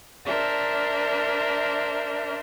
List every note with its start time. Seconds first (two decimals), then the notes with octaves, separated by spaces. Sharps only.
0.24 D4 A#4 C5 E5